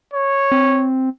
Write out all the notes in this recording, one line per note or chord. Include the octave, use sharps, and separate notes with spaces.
C#5
C4